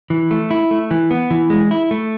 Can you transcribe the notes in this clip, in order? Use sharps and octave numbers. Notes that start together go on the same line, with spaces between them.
E3
A3
E4
A3
E3
B3
E3
G#3
E4
A3